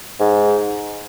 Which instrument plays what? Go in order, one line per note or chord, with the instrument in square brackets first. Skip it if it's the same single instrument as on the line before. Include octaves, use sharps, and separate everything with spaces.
[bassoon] G#2